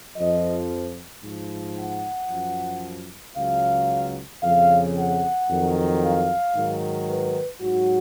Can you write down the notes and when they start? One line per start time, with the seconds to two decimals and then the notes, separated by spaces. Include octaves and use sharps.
0.16 F2 F3 D#5
1.23 G#2 F3
1.76 F#5
2.29 F#2 F3
3.35 C#2 C#3 F#3 F5
4.42 F2 C#3 F3 F5
4.95 F#5
5.49 F2 D#3 F#3
6.02 F5
6.54 G#2 D#3 F#3
7.08 B4
7.61 G#2 F#3 F#4